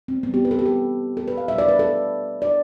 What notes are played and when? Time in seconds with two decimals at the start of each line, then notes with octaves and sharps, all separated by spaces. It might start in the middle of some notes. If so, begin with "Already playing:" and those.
0.08 C4
0.23 C3 E3 G3 B3
0.34 G4
0.45 B4
0.51 A4
0.59 G4
0.66 A4
1.17 A4
1.28 B4
1.38 F5
1.48 B2 G3 E5
1.58 D5
1.68 B4
1.79 A4
2.42 D5